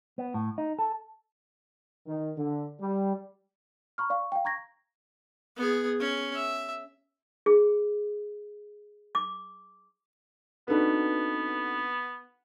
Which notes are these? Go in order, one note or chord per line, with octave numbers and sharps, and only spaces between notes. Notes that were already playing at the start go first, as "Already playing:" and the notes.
B3
A2
D#4
A4
D#3
D3
G3
A#5 B5 C#6 F6
D5 F5 C#6
F5 G5
A#5 C#6 G#6 A#6
B3 G#4
C#4
E5
G#4
D6
B3 C4 D4 D#4 F#4 A4 B4